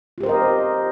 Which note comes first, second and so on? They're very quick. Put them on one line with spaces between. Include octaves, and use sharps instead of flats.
F4 G4 C5 A#4 D#5